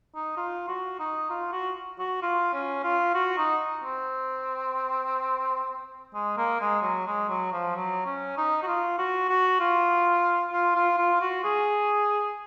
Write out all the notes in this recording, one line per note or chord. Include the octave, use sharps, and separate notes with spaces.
D#4
F4
F#4
D#4
F4
F#4
F#4
F4
C#4
F4
F#4
D#4
C4
G#3
A#3
G#3
F#3
G#3
F#3
F3
F#3
C#4
D#4
F#4
F4
F#4
F#4
F4
F4
F4
F4
F#4
G#4